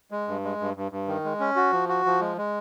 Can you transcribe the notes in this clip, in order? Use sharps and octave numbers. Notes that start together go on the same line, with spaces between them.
G#3
G2
G#3
G2
G2
G2
D#3
G#3
C#4
F#4
F3
F#4
F3
G#3
G#3